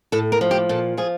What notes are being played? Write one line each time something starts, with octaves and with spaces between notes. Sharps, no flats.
A2 A4
A#4
F3
G4
A#2 A4
F3 G#4